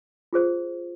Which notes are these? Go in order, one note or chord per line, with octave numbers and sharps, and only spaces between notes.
F4 G#4 C5